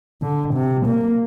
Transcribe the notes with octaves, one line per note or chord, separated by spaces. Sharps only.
D3
C3
A#3